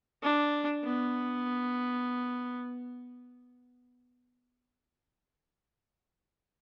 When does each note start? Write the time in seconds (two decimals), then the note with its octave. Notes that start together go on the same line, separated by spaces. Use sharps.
0.22 D4
0.84 B3